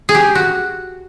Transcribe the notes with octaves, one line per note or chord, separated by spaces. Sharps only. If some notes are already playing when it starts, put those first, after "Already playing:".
G#4
G4
F#4